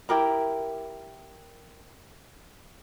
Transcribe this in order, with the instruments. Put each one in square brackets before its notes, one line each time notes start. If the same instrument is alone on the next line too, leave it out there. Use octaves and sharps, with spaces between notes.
[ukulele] E4 G4 A#4 A#5